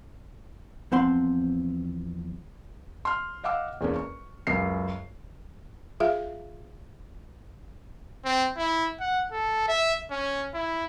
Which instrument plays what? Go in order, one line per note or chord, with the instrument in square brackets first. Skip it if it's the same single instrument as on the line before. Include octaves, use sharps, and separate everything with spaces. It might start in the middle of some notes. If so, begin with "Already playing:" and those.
[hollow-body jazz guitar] E2 F3 C4 F#5 C6
[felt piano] C6 F6
D#5 F5 F#5 D6 E6
E2 G#3 A#3 C#4
C#6
C#2 F#2 C7
[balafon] F4 G#4 E5 F5
[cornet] C4
E4
F#5
A4
E5
C#4
E4